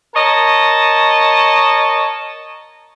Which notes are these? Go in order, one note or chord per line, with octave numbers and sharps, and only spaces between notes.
A#4 C#5 D#5 A5